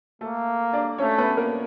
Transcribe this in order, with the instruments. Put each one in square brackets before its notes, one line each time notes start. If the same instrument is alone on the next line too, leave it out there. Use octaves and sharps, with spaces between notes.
[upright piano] A3 A4 [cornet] A#3
[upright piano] D4 D5
[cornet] A3 [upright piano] C#4 C#5
[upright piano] B3 B4
A#3 A#4